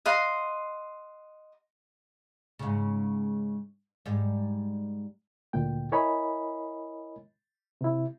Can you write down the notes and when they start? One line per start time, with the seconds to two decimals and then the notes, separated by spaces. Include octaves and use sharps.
0.06 D#5 F5 F#5 C6
2.59 G#2 C#3
4.06 G#2 G3
5.53 D2 A#2 G5
5.92 E4 A#4 C#5 D#5 G#5 B5
7.81 C3 E4